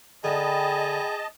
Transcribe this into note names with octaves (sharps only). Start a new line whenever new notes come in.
D3 D#4 G#4 D#5 G5 A5 B5